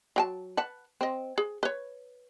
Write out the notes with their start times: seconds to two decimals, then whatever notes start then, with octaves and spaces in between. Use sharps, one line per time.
0.16 F#3 G5 A5
0.57 B4 F#5 A5
1.01 C4 D#5
1.38 G#4
1.63 B4 C#5